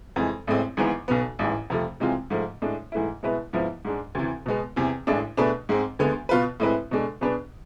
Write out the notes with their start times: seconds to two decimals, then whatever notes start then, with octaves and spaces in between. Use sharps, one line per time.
0.16 F2 E3 G#3
0.47 A1 A2 G#3 C4
0.77 G#1 G#2 E3 B3
1.08 B1 B2 B3
1.39 A1 G#2 E3
1.70 F2 C3 F3 A3
2.00 C3 E3 G#3 C4 F4
2.30 G#2 F3 A3
2.62 A2 G#3 D4
2.92 G#2 E3 A3 E4
3.23 B2 G#3 B3 E4 B4
3.53 G#2 F3 B3 E4
3.85 G#2 G#3 D4
4.15 D2 C3 E3
4.46 B2 G#3 B3
4.76 E2 C3 E3
5.07 A1 A2 E3 G#3 D4
5.37 B2 A3 D4 G#4 B4
5.69 G#2 G#3 C4
5.99 D2 D3 G#3 B3
6.29 B2 B3 F4 B4
6.60 A2 G#3 C4 E4 B4
6.91 B2 G#3 D4 A4
7.21 B2 B3 D4 G#4 B4